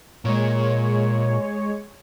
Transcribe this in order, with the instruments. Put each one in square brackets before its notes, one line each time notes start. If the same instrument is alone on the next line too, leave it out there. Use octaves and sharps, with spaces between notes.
[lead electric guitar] A#2 [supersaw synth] G#3 C#5